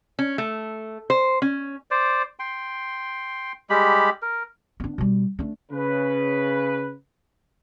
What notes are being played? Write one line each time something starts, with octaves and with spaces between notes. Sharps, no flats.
C#4
A3
C5
C#4
C5 D5
G5 C6
G3 G#3 G4 B5
A#4
B3 D4
B2 G3
A3 D4
C#3 B4